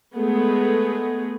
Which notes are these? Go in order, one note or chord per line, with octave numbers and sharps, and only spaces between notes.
G#3 A3 B3 G#4